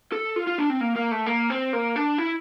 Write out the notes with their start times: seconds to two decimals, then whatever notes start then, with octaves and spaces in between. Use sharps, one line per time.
0.12 A4
0.36 F4
0.47 F4
0.58 D4
0.70 C4
0.81 A#3
0.96 A#3
1.11 A3
1.26 A#3
1.50 C4
1.73 A#3
1.96 D4
2.18 E4